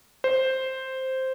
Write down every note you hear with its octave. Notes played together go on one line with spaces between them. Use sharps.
C5